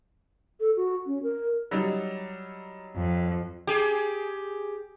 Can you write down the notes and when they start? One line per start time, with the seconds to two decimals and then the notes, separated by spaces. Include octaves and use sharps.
0.60 A4
0.76 F#4
1.06 C#4
1.23 A#4
1.71 F#3 G3 D#4
2.96 F2
3.67 G4 G#4